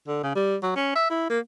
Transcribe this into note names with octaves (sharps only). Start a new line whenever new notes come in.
D3
C#3
G3
F#3
C#4
E5
E4
A#3